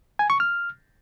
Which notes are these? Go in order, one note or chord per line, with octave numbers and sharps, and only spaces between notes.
G#5
C#6
F6